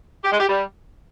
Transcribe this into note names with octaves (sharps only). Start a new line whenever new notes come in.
G4
G#3
G4
G3